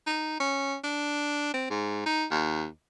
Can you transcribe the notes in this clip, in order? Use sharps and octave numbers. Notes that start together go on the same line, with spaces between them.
D#4
C#4
D4
C4
G#2
D#4
D#2